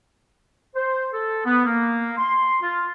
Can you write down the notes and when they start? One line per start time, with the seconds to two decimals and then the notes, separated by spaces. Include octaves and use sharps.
0.75 C5
1.13 A4
1.45 B3
1.66 A#3
2.18 C6
2.61 F4